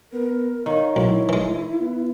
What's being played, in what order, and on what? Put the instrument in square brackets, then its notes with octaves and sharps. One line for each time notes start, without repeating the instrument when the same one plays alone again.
[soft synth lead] B3 [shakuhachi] A#4
[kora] D#3 [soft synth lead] C#5 [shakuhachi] F5
[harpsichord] B1 [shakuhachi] E4
[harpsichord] E3 G#3
[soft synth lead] B3